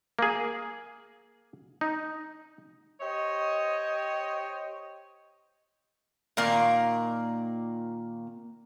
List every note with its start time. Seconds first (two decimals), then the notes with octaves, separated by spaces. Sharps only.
0.19 A#3 G#4
1.81 D#4
3.01 G4 C5 C#5 D#5 G5
6.37 A#2 D#3 A#3 D5